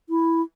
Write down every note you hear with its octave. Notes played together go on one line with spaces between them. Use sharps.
E4